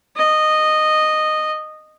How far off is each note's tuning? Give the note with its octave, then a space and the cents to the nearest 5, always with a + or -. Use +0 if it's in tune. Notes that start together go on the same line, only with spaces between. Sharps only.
D#5 -10